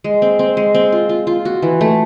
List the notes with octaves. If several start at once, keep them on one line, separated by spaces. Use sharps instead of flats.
G#3
C4
C4
G#3
C4
F4
F4
F4
F#4
E3
A3